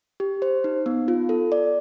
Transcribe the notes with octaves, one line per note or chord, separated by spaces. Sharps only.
G4
C5
D#4
B3
F4
A4
D5